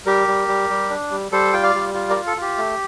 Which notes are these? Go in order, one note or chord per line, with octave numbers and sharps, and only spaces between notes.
G3 G4 A#4
G3
G3
G3
D4
G3
G3 A4 C5
F4 G5
D5 F5
G3
F4
A#4 D5
F4
A4
F4 G4
A3